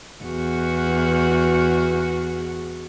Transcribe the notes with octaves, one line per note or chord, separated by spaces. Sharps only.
E2 F#4